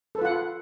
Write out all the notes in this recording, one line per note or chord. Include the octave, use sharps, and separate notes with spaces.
F4 A4 B4 F#5